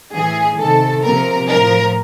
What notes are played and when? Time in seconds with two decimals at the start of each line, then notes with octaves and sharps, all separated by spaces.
0.13 A2 E3 G#4
0.58 C3 D#3 A4
1.03 C3 F3 A#4
1.48 A2 F3 A#4